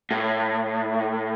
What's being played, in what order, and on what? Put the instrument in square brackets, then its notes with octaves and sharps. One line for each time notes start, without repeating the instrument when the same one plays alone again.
[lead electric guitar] A2